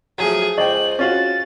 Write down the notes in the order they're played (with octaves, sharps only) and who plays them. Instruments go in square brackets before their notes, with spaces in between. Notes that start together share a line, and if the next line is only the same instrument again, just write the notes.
[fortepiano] F3 F#3 [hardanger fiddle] A3 G#4
[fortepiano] C#2 G5 [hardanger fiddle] C5 [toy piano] D#5 [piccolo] F#7
[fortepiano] C#4 F4 F#4 [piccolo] A6